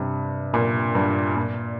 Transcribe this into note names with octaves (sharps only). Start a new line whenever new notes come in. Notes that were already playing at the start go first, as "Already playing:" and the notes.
Already playing: G2 C3
A#2
G2
A#2